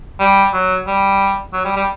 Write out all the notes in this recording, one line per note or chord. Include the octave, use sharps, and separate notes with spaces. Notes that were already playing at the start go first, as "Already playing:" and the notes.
G3
F#3
G3
F#3
G3
G3